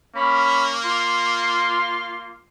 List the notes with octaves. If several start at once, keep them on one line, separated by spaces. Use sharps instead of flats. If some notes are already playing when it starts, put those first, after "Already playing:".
A#3 C#4 B5
F4 C6